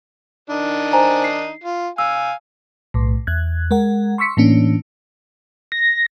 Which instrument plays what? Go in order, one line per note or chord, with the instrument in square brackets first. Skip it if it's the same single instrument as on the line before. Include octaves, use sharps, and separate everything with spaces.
[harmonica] D#3 D4 D#4
[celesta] C5 G#5 A#5
C7
[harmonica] F4
[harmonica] F5 G#5 [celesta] E6
[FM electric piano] B1 A2
E2 F#6 G#6
G#3 A#4 F#5
C6 C#6 E6 B6 C#7
A2 E3 A#3 C#4 D4
[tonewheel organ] A#6